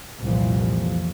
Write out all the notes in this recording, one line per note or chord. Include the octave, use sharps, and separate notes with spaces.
C2 F2 A#2 E3 F3